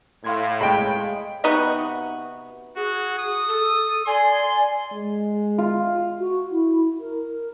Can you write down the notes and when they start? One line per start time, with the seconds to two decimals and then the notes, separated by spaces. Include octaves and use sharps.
0.24 A2 F5 C6 G#6
0.61 G#3 G5 B5
1.44 C3 B3 D#4 F#4
2.77 F#4 G#4
3.19 D#6
3.49 A4
4.07 D5 G#5 C6
4.92 G#3
5.58 F4
6.20 F#4
6.51 E4
7.00 A#4